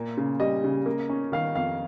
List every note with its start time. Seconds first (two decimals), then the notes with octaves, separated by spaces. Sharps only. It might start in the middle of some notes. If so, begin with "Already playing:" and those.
Already playing: A#2 A#3
0.17 C#3
0.40 G3 D#5
0.64 C#3
0.86 A#3
1.09 C#4
1.32 D#3 F5
1.56 F2 F5